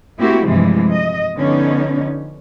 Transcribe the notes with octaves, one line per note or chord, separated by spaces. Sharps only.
A3 A#3 C4 E4 F#4 G4
G2 C3 E3 F3 G#3 A3
D#5
D3 F3 B3 C#4 D#4